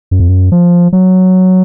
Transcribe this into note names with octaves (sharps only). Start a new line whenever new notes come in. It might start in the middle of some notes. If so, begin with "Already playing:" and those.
F#2
F2
F#2
F3
F#3